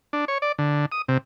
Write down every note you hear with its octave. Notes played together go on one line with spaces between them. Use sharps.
D4
C#5
D5
D3
D#6
C3